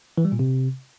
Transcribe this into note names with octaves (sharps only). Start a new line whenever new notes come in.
E3
G3
A#2
C3